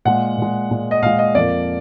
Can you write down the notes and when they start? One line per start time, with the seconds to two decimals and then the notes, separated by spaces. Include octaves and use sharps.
0.05 A#2 G#3 F#5
0.38 A#2 G#3
0.71 A#2 G#3
0.91 D#5
1.03 A#2 G#3 F5
1.19 D#5
1.35 F2 F3 A#3 D5